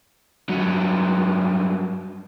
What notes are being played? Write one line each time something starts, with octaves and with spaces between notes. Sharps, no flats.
G2 F#3